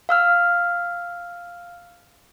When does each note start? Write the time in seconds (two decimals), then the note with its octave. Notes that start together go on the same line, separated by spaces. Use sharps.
0.09 F5 E6 F6